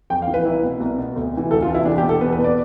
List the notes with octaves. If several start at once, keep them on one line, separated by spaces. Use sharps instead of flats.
F2 G5
F5
E3
B4
C2 E4
B2
C2
B2
D2
C3 E3
D2 A4
F4
C3 E3
E4
E2 D4
G4
B2
A4
E2 B4
B4
B2
D5